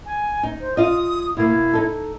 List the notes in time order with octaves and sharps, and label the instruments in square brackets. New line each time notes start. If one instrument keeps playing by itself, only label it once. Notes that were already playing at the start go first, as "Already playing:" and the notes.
[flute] G#5
[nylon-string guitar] D#4
[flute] C5
[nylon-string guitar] F4 D#5 [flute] D#6
[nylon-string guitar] B2 A#3 [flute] E4
[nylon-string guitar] D#4 A4